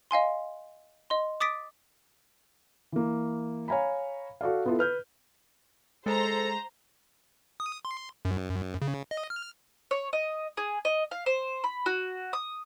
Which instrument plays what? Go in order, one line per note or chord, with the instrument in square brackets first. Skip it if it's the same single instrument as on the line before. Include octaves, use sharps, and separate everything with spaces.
[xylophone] D#5 F5 G#5 C6
D#5 C6
D6 D#6 A6 B6 D7
[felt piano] E3 A#3
C#5 F5 G#5 A#5 B5
F#4 A4 D5 F5
B3 E4 F4 A4 E5
B4 F6 G6
[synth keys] G#3 [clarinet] A4 [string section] C5 A#5
[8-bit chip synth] D#6
C6
F#2
C#3
D#5
F6
[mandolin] C#5
D#5
G#4
D#5
F5
C5
B5
F#4
D#6